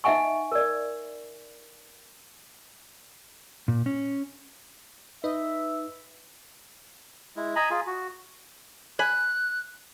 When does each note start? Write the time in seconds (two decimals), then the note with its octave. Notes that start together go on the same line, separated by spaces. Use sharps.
0.04 D#4 D#5 E5 F#5 G#5 C#6
0.52 A#4 D5
3.68 A#2
3.86 C#4
5.24 D#4 B4 D#5 E5
7.36 G#3 E4
7.56 D#5 G#5 A#5 B5
7.70 F4 G#4
7.86 F#4
8.99 G#5 B5 F#6